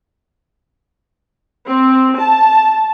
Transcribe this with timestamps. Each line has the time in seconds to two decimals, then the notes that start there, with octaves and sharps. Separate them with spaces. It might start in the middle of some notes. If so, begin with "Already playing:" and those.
1.66 C4
2.19 A5